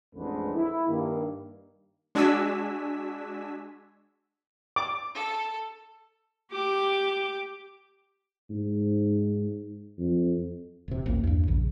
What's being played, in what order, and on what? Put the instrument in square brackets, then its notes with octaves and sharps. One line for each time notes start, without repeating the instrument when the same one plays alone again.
[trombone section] A1 F2 D3 G#3 A3 B4
E4
G2 D#3 A#3
[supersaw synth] G#3 D4 F#4 G#5 E6 B6
[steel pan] D6
[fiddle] A4
[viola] G4 D6
[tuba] G#2
F2
[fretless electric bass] D#1 C3
A1 D#2 A#3
E2 G2
A#1 C#3